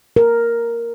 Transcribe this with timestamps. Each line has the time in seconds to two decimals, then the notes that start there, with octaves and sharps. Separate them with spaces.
0.16 A#4